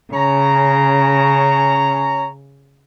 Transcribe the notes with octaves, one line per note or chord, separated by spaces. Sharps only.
C#3 C#4 C#5 A#5